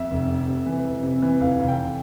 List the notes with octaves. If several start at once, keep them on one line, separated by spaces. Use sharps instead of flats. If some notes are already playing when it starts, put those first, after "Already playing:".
Already playing: F2 E5
F1
C3
C3
E3
F2
C3
E3
F1 F5
F1
G5